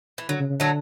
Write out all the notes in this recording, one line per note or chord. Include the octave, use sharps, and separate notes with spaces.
E3
D3 F#3
C#3
C#3
D3 F#3 A3